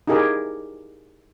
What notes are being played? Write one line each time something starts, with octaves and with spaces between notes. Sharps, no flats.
D#4 E4 G4 G#4 A#4